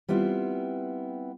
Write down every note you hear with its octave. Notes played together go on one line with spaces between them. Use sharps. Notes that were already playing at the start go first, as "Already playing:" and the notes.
G3 B3 C4 E4 F4